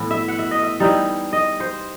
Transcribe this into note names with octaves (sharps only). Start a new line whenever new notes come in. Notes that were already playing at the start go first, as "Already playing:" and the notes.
Already playing: A2 E3 B3
E5
F#5
E5
D#5
E5
E3 G3 D#4
D#5
C5